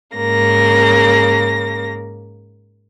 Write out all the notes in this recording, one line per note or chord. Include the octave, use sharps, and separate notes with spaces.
G#2 C#3 A#3 A#6